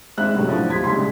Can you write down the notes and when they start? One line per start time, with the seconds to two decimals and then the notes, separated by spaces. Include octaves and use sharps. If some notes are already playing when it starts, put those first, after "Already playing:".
0.18 G#1 G#3 C4 E5 F#6
0.35 A2 C3 F#3 A3 C#4
0.49 F3 D4 E4
0.68 D#1 F3 C6 G#6 B6
0.84 C2 G#2 C#3 C6